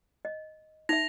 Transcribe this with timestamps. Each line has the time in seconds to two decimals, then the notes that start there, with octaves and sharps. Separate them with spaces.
0.25 D#5
0.89 D#4 E5 A#6 F7